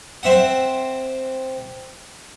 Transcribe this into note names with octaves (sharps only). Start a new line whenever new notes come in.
C4 E5 F#5